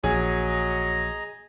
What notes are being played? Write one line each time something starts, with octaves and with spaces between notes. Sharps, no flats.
A#1 F#3 G#4 D#5 A#5